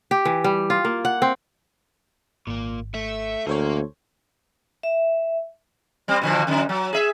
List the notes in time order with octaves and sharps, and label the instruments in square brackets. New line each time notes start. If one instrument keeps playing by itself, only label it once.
[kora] G4
E3
G3
F4
A#3
F#5
C4
[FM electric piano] G#1 [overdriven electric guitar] A#2 A#3
[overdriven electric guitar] A3 [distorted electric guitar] E5
[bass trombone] D2 [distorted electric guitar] A#3 [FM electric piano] A4 C5 C#5
[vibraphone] E5
[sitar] G3 C4
B2 D3 F3
F#2 D3
F#3
G#4 E5